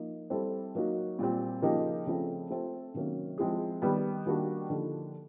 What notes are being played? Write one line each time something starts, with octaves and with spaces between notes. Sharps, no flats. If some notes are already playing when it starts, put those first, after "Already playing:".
Already playing: F3 A#3 D#4
G3 C4 E4 A4 C5
F#3 A#3 D#4 F#4
A#2 G3 C4
C#3 F3 A#3 D#4 G4
C#3 F3 A3 C4
A3 C4 F4 A4 C5
C3 D#3 F#3 A#3 C#4
F3 G#3 C4 E4 G#4
D#3 G3 B3
D#3 G3 A#3 D4 F#4
D3 F3 A#3 D#4 G4